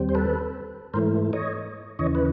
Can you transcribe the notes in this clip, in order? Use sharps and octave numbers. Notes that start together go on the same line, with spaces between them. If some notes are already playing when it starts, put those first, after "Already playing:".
Already playing: D#2 G3 C4
C5
A4 B4
G#2 E3 A3 A#4 C5
C#5 D#5
D#2 C#3 E3 C#5 D#5
B4